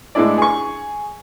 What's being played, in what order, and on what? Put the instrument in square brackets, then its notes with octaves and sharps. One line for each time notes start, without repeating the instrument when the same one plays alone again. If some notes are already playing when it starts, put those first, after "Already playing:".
[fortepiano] A2 G#3 D4 E4 D5
G#4 C#6